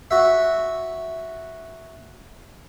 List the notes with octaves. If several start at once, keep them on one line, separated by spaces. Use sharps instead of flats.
F#4 E5